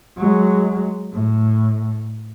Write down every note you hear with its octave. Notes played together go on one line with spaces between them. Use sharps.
F#3 G#3
A2